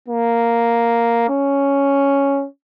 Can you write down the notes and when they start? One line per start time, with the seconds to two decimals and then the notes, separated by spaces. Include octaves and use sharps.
0.09 A#3
1.30 C#4